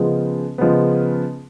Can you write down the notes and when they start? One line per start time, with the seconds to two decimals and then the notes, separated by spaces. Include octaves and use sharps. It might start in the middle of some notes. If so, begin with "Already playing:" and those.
Already playing: C#3 F3 G#3 B3
0.58 C#3 F3 G#3 B3